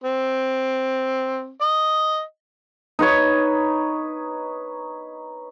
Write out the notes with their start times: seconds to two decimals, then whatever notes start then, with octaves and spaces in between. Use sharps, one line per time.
0.04 C4
1.61 D#5
2.99 D#4 B4 C#5